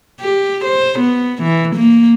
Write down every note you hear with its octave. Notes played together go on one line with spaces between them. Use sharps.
G4
C5
B3
E3
A#3